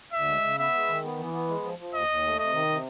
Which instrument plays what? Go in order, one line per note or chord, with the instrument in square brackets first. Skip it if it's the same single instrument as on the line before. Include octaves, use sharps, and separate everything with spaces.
[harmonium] D2 [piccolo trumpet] E5
[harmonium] G#3
C#3
[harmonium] B3 [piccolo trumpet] E5
[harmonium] G#3
D#3
B3
E3
B3
G#3
F3
F3
[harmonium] D#2 [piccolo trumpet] D#5
[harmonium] D#2
A3
[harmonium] C3 [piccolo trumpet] D#5
[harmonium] D#3
C3